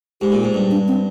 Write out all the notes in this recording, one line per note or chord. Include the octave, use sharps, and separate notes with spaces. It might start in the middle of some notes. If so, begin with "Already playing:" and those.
G#2 G4
A#2
G#2
G2
D4
C4